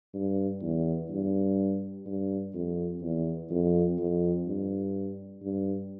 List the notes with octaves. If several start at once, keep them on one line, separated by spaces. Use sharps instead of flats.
G2
E2
G2
G2
F2
E2
F2
F2
G2
G2